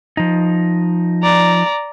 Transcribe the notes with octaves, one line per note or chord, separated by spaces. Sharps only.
F3 D#4
D5 A#5